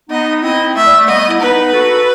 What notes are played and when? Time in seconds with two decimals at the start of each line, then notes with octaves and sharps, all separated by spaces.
0.10 B3 D#4 D#5
0.42 C4 E4 D#5
0.75 A3 E5
0.86 G3
0.97 A3
1.08 G3 B3 D#5
1.29 E4
1.40 B3 D#4 B4
1.73 F#4 A4
1.97 A4